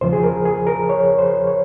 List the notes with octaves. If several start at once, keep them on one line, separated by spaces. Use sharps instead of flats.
D#2 C#3 F3 C5
G#4
A#4
G#4
A#4
C#5
C5
C#5